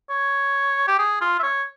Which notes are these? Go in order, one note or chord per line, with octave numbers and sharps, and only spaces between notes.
C#5
G4
G#4
F4
E5
C#5